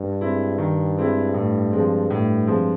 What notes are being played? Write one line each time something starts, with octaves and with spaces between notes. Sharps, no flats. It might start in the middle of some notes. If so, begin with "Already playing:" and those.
Already playing: G2
G#3 C4 E4
D#3
G#3 C4 E4
A2
F3 G#3 C4
A2
F3 G#3 C4